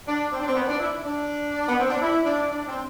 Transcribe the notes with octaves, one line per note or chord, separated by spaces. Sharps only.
D4
C4
D4
C4
B3
D4
E4
D4
B3
C4
D4
E4
D4
D4
C4